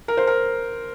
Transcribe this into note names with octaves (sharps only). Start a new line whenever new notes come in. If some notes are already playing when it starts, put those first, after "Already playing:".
A#4
C5
A#4